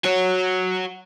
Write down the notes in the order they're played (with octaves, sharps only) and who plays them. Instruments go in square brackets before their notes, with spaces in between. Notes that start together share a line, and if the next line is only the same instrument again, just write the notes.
[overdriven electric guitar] F#4 C#5